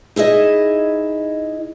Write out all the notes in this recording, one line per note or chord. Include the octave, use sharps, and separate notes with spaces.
D#4 E4 G#4 D#5